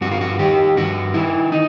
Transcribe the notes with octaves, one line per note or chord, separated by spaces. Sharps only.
G2 F#4
F4
F#4
D#3 G4
G2 F#4
D#3 E4
D#4